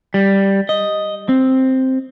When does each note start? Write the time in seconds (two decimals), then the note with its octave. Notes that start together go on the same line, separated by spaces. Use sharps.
0.14 G3
0.69 D#5
1.29 C4